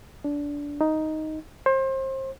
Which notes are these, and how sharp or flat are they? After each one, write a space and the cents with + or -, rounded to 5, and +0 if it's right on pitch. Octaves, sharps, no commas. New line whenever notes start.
D4 -20
D#4 +5
C5 +30